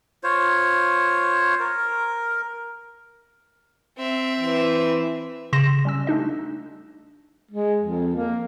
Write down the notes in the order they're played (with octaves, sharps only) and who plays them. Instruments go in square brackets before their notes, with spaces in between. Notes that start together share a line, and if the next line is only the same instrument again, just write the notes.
[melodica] F4 C5 C#5
A#4
[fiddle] C4 E5
[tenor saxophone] E3
[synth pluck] C#3 C6 A#6 E7
G3 C#4 E6
A3 D4 D#4 D#5
[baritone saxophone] G#3
F2
A#3